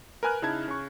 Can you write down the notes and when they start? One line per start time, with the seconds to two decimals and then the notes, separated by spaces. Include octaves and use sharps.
0.23 A#4 B4 G#5 F6 F#6
0.42 C#3 D#4 E4 A5 G#6
0.68 C#3 C#6